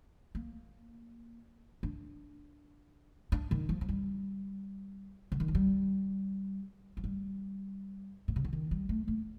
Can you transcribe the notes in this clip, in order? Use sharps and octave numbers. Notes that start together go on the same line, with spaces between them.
A#3
D4
D4
D#3
F3
F3
G3
D3
D#3
F3
G3
F3
G3
A#2
C3
D3
D#3
G3
A3
A#3